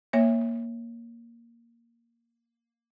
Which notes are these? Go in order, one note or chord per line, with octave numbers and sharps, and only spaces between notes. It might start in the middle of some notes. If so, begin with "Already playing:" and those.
A#3 C#5 E5